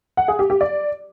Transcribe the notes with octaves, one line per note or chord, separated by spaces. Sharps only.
F#5
G#4
G4
G4
D5